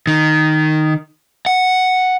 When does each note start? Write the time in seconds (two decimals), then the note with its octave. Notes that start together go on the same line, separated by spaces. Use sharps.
0.07 D#3
1.46 F#5